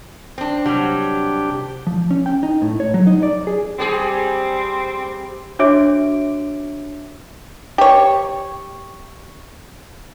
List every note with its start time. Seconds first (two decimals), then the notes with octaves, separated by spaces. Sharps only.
0.38 C4 D4
0.66 C3 F#3 G3 D4 G4
1.87 F3
2.11 C#4
2.26 G5
2.43 D#4
2.62 A2
2.80 C#5
2.94 F#3
3.07 D#4
3.23 D5
3.47 G#4
3.79 G3 C4 G4 G#4
5.59 D4 F#4 C#5 E5 D6 D7
7.78 G4 C#5